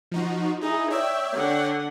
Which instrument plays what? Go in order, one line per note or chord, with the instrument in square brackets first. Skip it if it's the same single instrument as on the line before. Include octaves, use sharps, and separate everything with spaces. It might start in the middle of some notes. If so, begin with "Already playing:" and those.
[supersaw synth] F3 D#4 F#4
[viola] D#4 [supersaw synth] E4 G#4
[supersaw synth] C#5 D5 G5 [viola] E5
[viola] D3 F#5